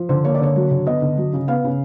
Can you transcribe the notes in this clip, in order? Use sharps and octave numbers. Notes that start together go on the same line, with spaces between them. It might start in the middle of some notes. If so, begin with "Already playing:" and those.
Already playing: F3
D3 C5
A#3 C#5
D5
D3 C#5
F#3
D3
B3 D#5
D3
F#3
C#3
B3 F5
C#3